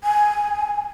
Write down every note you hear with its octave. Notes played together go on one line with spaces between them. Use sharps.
G#5